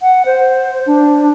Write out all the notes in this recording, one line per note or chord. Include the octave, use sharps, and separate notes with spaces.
F#5
C5
D4